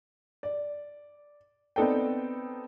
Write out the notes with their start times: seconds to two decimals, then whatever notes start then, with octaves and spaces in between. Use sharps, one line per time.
0.43 D5
1.76 B3 C4 D#4 A4 D5 G5